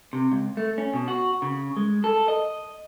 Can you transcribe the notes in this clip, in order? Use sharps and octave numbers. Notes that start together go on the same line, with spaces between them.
C3
C#2
A3
C#4
B2
F#4
C#3
G#3
A4
D#5